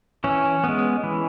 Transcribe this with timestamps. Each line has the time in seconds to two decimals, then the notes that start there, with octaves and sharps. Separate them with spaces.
0.24 E3 C#4
0.64 G#3 B3
1.04 E3